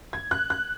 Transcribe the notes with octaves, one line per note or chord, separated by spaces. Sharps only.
G#6
F#6
F#6